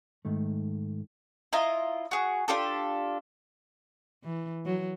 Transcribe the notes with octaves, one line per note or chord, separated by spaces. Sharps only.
G#2 D#3 A3
E4 F4 D#5 A#5
F#4 G#4
D4 F4 G4 A4
E3
F#3